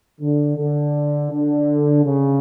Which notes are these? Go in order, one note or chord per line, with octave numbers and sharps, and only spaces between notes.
D3
D3
D3
C#3